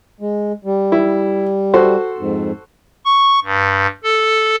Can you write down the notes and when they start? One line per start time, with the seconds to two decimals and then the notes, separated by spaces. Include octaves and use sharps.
0.20 G#3
0.65 G3
0.92 E4
1.74 F#4 A4 C5
2.18 F2 G#2
3.05 C#6
3.44 G2
4.03 A4